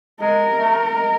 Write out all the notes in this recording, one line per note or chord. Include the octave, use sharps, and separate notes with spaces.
G#3 A#4
A3
G#3